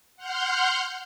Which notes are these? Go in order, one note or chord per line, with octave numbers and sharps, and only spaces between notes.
F#5 C6 F6 G6